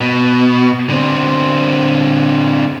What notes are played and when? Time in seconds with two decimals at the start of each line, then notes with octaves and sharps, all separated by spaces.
0.01 B2
0.89 D3 C4